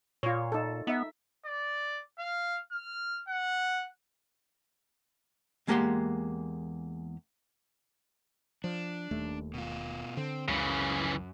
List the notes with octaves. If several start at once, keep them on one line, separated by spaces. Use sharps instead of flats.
A#2 F4 C#5
D#4 A4
B3 D#4 E5
D5
F5
F6
F#5
E2 G#3 A#3 G4 F#5 C6
F3 D4
D#1 D#2 A3
B2 F4
D3 C4
C#2 F#2 C#3 E3 F#3